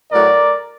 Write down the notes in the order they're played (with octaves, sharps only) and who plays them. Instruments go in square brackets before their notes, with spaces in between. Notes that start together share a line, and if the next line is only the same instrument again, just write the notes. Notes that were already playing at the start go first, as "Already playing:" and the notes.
[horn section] A2 F#3 A3 A#4 D5